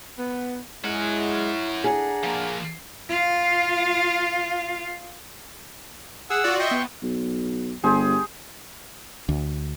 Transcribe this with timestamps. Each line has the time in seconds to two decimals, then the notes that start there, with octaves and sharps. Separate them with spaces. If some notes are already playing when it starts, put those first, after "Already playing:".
0.18 B3
0.84 G#3 C#4 E4 F#5
1.84 D4 G#4 F#5 A#5
2.23 F3 A#3
3.09 F4 F5
6.30 G#4 F#5 E6
6.44 F4 F#4 D5
6.59 D#5 E5 G5 C6 C#6
6.71 B3
7.03 B1
7.83 G1 G4 G#4 C5
9.29 D2